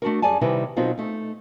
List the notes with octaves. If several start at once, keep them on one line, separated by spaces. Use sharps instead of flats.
A3 D4 F#4 A#4
F#2 G3 G#4 D5 G#5 A5
C3 D#3 G3 E4 B4
B2 F#3 C4 D#4 F4 A#4
A3 D#4